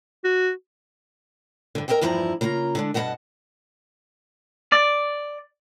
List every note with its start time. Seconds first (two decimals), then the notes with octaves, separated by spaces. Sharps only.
0.25 F#4
1.75 G2 D3
1.88 A#4 C5 D#5 E5 G5
2.01 E2 G2 F3 E4 A5 A#5
2.41 C#3 A#3 F4 A#5
2.75 D3 G#3 D4
2.94 G2 B2 G3 D#5 F#5 A5
4.72 D5